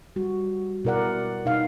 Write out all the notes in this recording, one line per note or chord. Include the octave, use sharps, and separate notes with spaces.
G3 F#4
B2 E4 A#4 D5 F#5
B2 D#4 F5